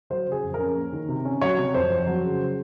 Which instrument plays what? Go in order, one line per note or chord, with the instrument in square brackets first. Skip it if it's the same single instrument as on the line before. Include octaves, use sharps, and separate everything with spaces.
[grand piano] F#3 C5
C#3
G#4
F2
A#4
C#4
A#3
D#3
C3
C#4
F#3 C#5
C3
F2 C5
F2
F#3
C#3